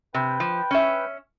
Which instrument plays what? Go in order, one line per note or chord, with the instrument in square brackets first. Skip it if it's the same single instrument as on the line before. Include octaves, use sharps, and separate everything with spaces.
[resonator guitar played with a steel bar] C3 [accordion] B4 G5
[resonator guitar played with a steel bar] F3
C#4 E5